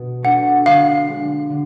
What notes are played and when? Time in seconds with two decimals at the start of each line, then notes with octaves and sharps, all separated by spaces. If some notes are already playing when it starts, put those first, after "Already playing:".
Already playing: B2 F#4
0.23 A3 D4 F#4 F#5
0.66 D3 F5
1.08 G#3 D4
1.50 D3